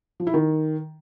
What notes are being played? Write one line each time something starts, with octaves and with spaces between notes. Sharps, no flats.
F3
E4
D#3